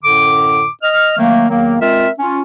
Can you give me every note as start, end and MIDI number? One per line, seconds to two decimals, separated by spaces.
0.03 0.67 42
0.03 0.67 45
0.03 0.67 50
0.03 0.67 86
0.83 1.14 75
0.83 1.14 89
1.17 1.46 51
1.17 1.46 54
1.17 1.46 57
1.17 1.46 58
1.49 1.77 40
1.49 1.77 51
1.49 1.77 54
1.49 1.77 58
1.80 2.08 56
1.80 2.08 60
1.80 2.08 65
1.80 2.08 70
1.80 2.08 76
2.19 2.41 61
2.19 2.41 65